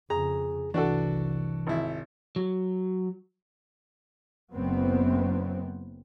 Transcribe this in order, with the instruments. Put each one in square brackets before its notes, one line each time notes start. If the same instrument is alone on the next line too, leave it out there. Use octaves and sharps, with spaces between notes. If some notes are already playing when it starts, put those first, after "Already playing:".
[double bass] F2 C#3 [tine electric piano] G#4 [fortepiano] A#5
[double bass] F1 C2 [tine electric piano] E3 [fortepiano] D4 F#4 A4
[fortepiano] G#1 E4
[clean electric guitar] F#3
[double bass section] F#1 F#2 B3 C4